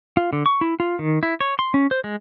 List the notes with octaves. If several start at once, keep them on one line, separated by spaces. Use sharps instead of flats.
F4
D3
C#6
E4
F4
D#3
E4
C#5
C6
C#4
C5
G#3